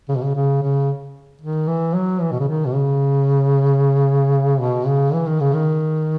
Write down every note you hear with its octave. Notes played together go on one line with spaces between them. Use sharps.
C#3
B2
C#3
C#3
C#3
D#3
E3
F#3
E3
B2
C#3
D#3
B2
C#3
B2
C#3
E3
D#3
C#3
D#3